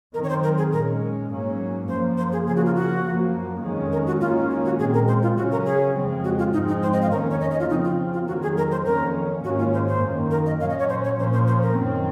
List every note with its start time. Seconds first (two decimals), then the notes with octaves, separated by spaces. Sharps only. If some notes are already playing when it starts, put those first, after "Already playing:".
0.14 F#2 D#3 F#3 C4 A#4
0.24 C#5
0.29 C5
0.43 A#4
0.58 G#4
0.72 A#2 G#3 C#4 A#4
1.30 G#2 F#3 A#3 C#4
1.88 F#2 F3 A#3 C5
2.18 C5
2.32 G#4
2.46 C#3 F3 A#3 G#4
2.56 F#4
2.66 F4
2.76 F#4
3.05 F#2 F3 A#3
3.63 F2 D#3 G#3 C#4
3.92 A#4
4.07 F#4
4.21 G#2 D#3 A#3 C#4 F4
4.50 F4
4.65 F#4
4.79 A#2 G#3 C4 G#4
4.94 A#4
5.08 C5
5.23 F4
5.37 C#3 F#3 C#4 F#4
5.52 A#4
5.66 G#4
5.96 F2 C#3 F3 G#3 C4
6.24 F#4
6.38 F4
6.53 G#2 F3 G#3 C4 D#4
6.68 D#4
6.83 C5
6.93 D#5
7.02 F5
7.11 F2 D#3 A#3 C#4 A#4
7.31 C#5
7.41 D#5
7.51 D#5
7.60 F4
7.70 C#3 F3 C4 D#4
7.84 F4
8.13 F4
8.28 F2 D#3 F#3 A#3 F#4
8.42 G#4
8.57 A#4
8.71 C5
8.86 F2 D#3 A#3 C#4 A#4
9.44 G#2 D#3 A#3 C#4 F#4
9.59 F4
9.74 C5
9.88 C5
10.02 F#2 D#3 A#3
10.31 A#4
10.46 D#5
10.61 A#2 F#3 C#4 F5
10.70 D#5
10.79 C#5
10.89 C5
11.04 C#5
11.18 A#2 F3 A#3 C#4 C5
11.33 C5
11.48 C5
11.62 A#4
11.76 F#2 D#3 F#3 C4